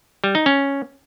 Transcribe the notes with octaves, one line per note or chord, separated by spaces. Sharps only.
G3
D#4
C#4